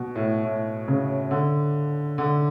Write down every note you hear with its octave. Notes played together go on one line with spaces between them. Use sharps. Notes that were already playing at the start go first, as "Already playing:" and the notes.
Already playing: B2
A2
A2
C#3
D3
D3